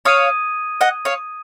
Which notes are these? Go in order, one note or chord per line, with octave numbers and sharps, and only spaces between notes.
C#5 F5 D#6 G#6 D#7
D#5 F#5
C#5 F5